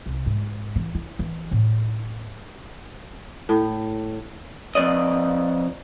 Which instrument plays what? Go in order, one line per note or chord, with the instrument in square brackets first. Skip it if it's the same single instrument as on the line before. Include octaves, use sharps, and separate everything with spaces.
[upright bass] C2
G#2
E3
E4
E3
A2
[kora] A2
[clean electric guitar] F2 F#3 D5 D#5